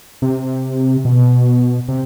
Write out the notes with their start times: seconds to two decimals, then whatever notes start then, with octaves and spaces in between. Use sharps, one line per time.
0.22 C3
1.05 B2
1.88 C3